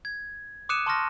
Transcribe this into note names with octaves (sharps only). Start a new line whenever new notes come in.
G#6
D6 D#6 F#6 C#7 D#7 E7
A5 C6 C#6 D#6 F6 A#6